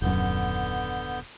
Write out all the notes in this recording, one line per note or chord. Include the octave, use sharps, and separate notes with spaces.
D#1 F#2 D3 B3 G6